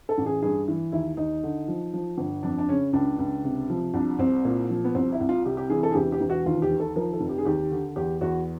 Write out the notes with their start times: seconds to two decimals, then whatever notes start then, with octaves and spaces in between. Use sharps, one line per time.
0.09 A4
0.18 A1
0.26 G#4
0.43 G2 G#4
0.68 E3
0.92 D#2 E4
1.17 D#2 D#4
1.43 D3
1.68 F3
1.94 F3
2.18 G1
2.43 F2 D4
2.59 D4
2.69 C#3 C#4
2.93 C#2 D4
3.19 C#2
3.44 C3
3.70 F3
3.94 C2 D4
4.19 C2 C4
4.45 A#2
4.70 F3
4.84 B3
4.95 C2 C4
5.12 E4
5.21 C2
5.29 F4
5.46 C3 G4
5.57 G4
5.70 E3 G#4
5.83 A4
5.91 G#4
5.95 E1 G4
6.12 G4
6.21 E1
6.30 F#4
6.46 D#2 F4
6.62 G4
6.71 D#3
6.80 A4
6.96 F3 A#4
7.13 A4
7.21 F1
7.29 G4
7.38 G#4
7.45 D#2 G4
7.71 D3
7.96 E2 G4
8.21 E2 F#4